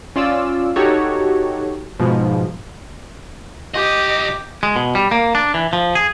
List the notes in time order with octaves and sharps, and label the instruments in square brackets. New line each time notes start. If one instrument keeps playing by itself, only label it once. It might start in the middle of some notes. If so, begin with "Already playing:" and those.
[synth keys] C#4 F4 D5 E6
D#4 F#4 G4 A4 C#5
G#2 B2 F3
[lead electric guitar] B1 D#5 [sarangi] G4
[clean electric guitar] G#3
B2
G3
A#3
D4
E3
F3
G#4